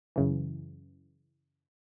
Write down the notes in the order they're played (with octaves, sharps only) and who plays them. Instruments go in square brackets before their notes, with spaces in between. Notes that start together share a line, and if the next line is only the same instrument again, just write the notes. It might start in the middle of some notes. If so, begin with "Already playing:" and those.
[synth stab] F#2 C#3 E3